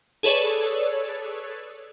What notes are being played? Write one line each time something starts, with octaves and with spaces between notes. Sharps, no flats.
G#4 A4 B4 C#5 D5